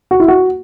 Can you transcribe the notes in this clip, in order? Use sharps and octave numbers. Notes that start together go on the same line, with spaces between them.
F#4
E4
F#4